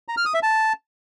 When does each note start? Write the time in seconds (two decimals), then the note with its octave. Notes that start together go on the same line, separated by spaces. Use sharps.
0.08 A#5
0.17 F6
0.26 D#6
0.34 E5
0.43 A5